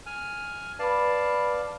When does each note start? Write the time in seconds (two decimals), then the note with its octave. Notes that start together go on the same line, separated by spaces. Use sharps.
0.06 G#5 F6
0.79 B4 D5 F5 A5 B5